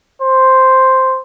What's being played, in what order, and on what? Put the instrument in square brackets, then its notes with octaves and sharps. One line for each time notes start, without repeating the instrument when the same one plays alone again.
[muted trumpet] C5